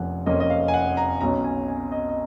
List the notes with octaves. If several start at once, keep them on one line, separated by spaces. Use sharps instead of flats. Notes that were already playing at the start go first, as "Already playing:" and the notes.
Already playing: F1 F2 F3 A#3 C#4 F#5 G#5
F1 F2 F3 A#3 C#4 D#5
D#5
F5
G#5
F#5
A#5
B1 B2 F#3 C#4 A#5
G#5
G#5
D#5
D#5